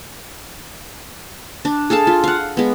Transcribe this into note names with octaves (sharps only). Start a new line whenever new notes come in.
D4
G#4 A4 F5 A5
F4
F5 F#5
G#3 B3